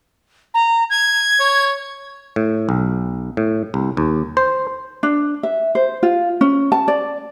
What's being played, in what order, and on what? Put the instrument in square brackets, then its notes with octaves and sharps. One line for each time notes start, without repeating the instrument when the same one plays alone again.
[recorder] A#5
G#6
[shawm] C#5
[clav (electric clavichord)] A2
B1
A2
C2
D#2
C5
[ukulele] D4
E5
C5
F4
C#4
A5
D5